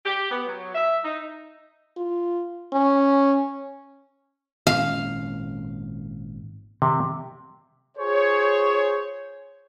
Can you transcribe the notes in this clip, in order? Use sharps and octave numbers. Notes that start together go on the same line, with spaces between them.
G4
B3
F#3
E5
D#4
F4
C#4
G#1 A#2 C#4 F5
C3 D#3
F4 G#4 C5 C#5